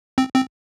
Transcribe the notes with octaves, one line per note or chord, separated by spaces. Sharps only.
C4
C4